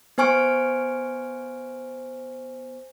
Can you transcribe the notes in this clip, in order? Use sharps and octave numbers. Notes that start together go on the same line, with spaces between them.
B3 C5 G#5 C#6 F6 D7